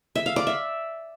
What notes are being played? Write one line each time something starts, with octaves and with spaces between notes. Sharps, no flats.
E5
F5
D5
E5